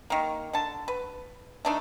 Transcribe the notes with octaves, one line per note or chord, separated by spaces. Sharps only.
D#3 A#3
D3 A5
B4
A3 D4 D#4